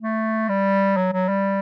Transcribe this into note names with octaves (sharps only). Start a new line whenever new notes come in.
A3
G3
F#3
F#3
G3